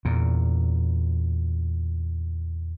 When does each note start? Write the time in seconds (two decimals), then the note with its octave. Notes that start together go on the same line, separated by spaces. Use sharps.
0.05 E2 A#2